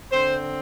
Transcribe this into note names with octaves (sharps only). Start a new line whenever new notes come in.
D3 C4 C5